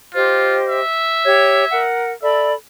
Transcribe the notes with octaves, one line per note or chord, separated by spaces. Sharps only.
F4 G4 C5 D#5
E5
G4 C#5 G#6
A#4 F#5
A4 D5 E5 B5